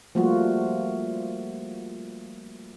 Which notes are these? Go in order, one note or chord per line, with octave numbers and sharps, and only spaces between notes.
F3 G3 A3 A#3 F4 F#4